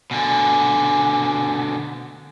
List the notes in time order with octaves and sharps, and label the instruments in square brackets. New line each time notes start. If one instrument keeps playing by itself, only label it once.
[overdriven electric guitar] B2 D3 [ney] G#5